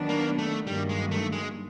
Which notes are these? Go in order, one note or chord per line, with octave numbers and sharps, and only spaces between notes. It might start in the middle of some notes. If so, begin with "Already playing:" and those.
Already playing: D#3 F#3 B3 D4
A#3
A3
G2 D#3 F#3 G3 A#3
G#3
A3
G#3